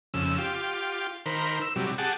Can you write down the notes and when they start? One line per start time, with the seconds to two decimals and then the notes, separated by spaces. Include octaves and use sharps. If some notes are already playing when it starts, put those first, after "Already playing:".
0.14 F2 C#3 E6
0.38 F4 G4
1.26 D#3 A#4 C5 B5
1.61 E6
1.76 C3 F#3 G3
1.98 G4 G#4 F#5 A5